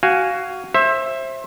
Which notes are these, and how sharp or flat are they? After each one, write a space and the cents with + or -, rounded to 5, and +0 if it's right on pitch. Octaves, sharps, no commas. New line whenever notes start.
F#4 +15 F5 +0 G#5 -5
C5 +30 E5 +0